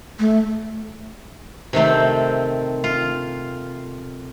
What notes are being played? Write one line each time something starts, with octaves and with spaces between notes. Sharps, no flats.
A3
C3 D#3 A3 C4
F4